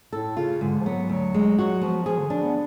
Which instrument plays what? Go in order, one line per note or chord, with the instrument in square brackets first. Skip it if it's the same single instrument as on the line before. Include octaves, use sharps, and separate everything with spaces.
[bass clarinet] A2 [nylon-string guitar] A4
[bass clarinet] C#3 [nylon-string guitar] F4
[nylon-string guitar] G#2 [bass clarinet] D3
[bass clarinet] F3
[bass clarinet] F#3 [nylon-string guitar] B3
[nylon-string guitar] D2 [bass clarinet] F#3
[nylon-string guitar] G#3
[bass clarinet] F#3 [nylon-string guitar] F#4
[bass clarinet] F3 [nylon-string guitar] B3
[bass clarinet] F3 [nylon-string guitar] G#4
[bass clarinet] D3
[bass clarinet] F3 [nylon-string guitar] D4
[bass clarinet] B3